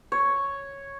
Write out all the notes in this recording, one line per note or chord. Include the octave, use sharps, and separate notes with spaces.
C#5